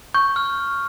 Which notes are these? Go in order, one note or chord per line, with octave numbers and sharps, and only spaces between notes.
C#6 G6
F6